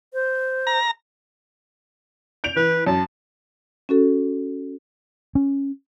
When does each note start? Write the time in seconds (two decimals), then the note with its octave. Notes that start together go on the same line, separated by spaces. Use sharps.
0.13 C5
0.67 A#5
2.44 G6 D7 F7
2.56 E3 B4
2.86 F#2 A5
3.89 C#4 F#4 A4
5.35 C#4